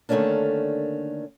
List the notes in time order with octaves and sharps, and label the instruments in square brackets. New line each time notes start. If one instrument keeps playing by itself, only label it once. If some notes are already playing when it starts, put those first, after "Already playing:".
[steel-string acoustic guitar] D3 D#3 A3 A#3 C#4 D4